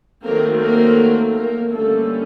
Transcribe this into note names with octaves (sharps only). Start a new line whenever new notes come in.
D#3 F#3 A3 A#3 C4 A#4
A#3 A#4
A#3 A#4
D3 G3 A3 A#3 C#4 A4